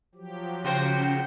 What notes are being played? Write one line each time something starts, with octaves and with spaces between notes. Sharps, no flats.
F3 F#3 G4
C#3 F4 F#4 C5 G5